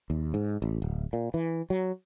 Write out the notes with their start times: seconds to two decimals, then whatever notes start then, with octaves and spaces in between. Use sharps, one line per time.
0.10 D#2
0.34 G#2
0.62 A1
0.82 D1
1.13 A#2
1.34 E3
1.70 F#3